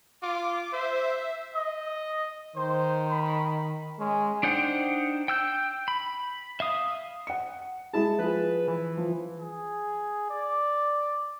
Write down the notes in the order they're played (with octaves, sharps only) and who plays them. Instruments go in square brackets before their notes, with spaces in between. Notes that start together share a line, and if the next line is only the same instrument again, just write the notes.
[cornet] F4 [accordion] D6
[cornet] C5 [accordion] E5
[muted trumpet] D#5
[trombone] D#3 [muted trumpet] C5
[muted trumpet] B5
[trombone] G#3 [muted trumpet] C#4
[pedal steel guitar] D4 D#4 C5 F#5 G5
G5 E6 G6
B5
E5 F5 D#6
[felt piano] F#5 C#7
[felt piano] G#3 E4 G#4 [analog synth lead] A5
[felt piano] F3 G#4 [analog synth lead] B4
[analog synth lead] E3
[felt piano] F3
[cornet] G#4
D5